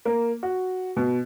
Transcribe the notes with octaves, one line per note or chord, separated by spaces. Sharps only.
A#3
F#4
B2